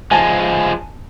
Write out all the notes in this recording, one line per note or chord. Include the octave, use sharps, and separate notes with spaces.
F3 G#3 G#5 A5